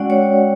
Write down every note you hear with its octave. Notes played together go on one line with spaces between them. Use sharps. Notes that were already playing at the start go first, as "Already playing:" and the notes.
Already playing: G#3 C#4 F#4 D5 F#5 G5
C#5